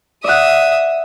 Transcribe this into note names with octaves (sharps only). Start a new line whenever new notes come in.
D5 E5 F#5 D#6